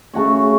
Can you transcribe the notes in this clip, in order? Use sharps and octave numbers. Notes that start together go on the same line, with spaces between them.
C#3 A3 F#4 C#5